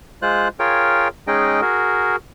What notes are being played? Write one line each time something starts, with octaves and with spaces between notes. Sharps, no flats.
G#3 F4 C5 F#6
F4 G#4 A#4 C#5 G5
G#3 C#4 D#4 G#4 D#5 G5
F#4 G#4 A#4